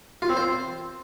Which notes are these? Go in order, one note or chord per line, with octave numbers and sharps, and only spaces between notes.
F4
C4
C5